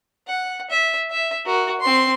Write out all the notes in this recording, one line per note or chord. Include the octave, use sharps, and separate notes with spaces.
F#5
E5
E5
F#4 A#4
C4 C6